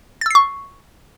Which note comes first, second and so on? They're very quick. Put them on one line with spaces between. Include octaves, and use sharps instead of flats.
A6 E6 C7 C#6